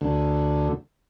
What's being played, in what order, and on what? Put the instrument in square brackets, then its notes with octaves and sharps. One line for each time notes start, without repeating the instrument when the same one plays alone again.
[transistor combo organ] D2